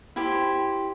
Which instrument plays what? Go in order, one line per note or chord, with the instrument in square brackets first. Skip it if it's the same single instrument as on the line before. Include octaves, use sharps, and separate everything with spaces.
[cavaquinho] E4 G4 C5